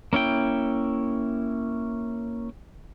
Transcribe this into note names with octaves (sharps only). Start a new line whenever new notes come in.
A#3 C#4 E4 G5